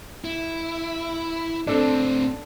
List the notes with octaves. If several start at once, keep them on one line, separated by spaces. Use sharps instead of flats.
E4
A2 C4 D4 A4